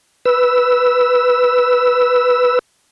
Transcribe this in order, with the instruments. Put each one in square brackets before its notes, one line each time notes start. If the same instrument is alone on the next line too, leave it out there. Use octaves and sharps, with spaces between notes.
[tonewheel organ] B4 E6